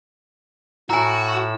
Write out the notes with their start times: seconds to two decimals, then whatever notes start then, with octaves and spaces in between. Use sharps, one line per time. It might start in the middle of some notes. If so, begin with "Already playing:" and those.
0.90 A2 F#4 G#5 A#5 E6